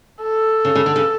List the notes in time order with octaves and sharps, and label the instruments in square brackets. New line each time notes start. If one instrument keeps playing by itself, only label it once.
[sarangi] A4
[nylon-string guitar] C#3
C#3
D3
C#3